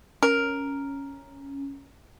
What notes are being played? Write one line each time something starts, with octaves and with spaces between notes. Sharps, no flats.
C#4 A#4